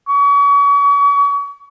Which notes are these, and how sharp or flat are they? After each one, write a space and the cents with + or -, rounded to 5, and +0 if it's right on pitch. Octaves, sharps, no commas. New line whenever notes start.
C#6 +40